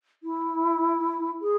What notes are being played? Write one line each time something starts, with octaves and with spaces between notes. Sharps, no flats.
E4
G#4